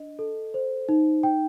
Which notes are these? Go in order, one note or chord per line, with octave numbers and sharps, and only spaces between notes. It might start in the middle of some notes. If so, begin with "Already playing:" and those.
Already playing: D4 D#5
A4
C5
D#4
G5